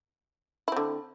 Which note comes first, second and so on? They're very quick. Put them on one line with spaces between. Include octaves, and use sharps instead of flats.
E4 C4 D3